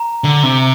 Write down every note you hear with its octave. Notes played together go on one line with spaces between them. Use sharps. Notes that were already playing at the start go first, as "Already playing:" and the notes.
Already playing: A#5
D3
C3